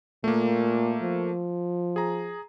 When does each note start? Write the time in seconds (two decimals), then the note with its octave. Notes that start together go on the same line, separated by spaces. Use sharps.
0.24 A#2 A3 A#3
1.02 F3
1.96 G#4 A#5